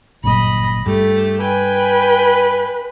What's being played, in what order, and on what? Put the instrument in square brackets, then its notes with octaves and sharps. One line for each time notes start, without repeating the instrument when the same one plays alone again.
[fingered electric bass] G1 F#2 A#2 [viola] D#5 B5
[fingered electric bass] G2 [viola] A3 G4
[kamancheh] B4 [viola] G5 G#5